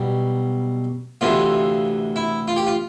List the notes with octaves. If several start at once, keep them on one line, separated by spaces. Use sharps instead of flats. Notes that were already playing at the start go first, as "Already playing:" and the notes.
Already playing: B1 B2 G3
D2 C3 E3 F4
E4
F4
G4
F4